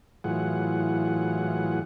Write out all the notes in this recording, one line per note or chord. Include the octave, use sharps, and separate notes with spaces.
A2 E3 F#3 F4 G#4 F#5